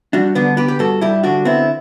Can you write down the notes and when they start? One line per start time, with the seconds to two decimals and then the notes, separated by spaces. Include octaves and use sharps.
0.13 G3 D4 F#4
0.35 D3 B3 D4
0.57 B3 G4 B4
0.68 G4
0.79 G2 F#4 A4
1.01 G3 E4 G4
1.23 D3 D4 F#4
1.45 B3 C4 E4